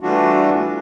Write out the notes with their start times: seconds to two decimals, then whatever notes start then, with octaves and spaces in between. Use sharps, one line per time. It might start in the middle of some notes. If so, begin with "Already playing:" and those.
0.01 E3 G3 A3 D4 F4 F#4